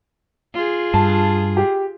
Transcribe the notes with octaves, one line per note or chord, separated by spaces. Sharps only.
F4 G#4
G2 A5
G4